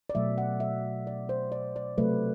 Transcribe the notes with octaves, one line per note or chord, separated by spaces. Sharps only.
D5
B2 F#3 A3 E5
F#5
E5
D5
C5
D5
D5
C3 F#3 A3 B4